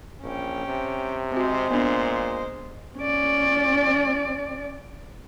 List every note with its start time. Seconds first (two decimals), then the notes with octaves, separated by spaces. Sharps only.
0.23 A#1 C#4 G5
0.67 C3
1.32 G#3 C4 F#4 C5
1.71 A#2 B3 D4
2.98 C#4 D5